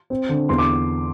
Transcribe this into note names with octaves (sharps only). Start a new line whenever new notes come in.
C4
D3
E2 C6
D6